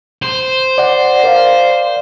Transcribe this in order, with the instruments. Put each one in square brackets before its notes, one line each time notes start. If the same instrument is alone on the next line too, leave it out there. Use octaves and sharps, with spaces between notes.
[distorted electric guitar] C5
[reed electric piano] D5 F#5
A#4 D5 F5